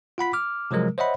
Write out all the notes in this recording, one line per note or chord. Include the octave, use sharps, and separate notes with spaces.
F4 F#5 B5 B6
D6 F6
C3 F3 F#3 G#3 A#4
C5 C#5 D#5 E5 F#5 B5